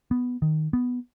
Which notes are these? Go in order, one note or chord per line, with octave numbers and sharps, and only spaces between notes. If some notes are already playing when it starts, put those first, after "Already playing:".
B3
D#3
B3